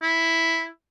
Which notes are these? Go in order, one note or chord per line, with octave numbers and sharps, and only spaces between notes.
E4